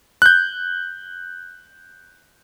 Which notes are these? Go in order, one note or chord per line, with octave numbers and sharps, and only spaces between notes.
F#6 G6